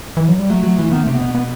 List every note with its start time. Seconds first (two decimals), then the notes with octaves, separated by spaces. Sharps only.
0.17 E3
0.28 F#3
0.39 G3
0.50 F#3 A3
0.63 F#3
0.79 E3
0.91 D#3 B3
1.03 C3 A3
1.14 B3
1.20 B2
1.35 B3